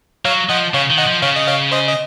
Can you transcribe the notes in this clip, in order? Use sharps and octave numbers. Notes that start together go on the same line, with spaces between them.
F#3 C#5 F5
F3 D#5 F#5
C#3 C#5 F5
D#3
D#5 F#5
F3
C#3 C#5 F5
D#5
C#5 F5
C5 D#5
D#5